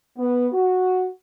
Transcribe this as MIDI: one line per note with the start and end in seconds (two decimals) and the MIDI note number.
0.18 0.48 59
0.53 1.09 66